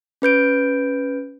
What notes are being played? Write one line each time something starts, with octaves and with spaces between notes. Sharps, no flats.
C#4 B4 G6 D7